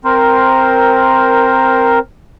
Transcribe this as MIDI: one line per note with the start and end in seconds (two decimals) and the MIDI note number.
0.05 1.99 60
0.05 1.99 70
0.05 1.99 72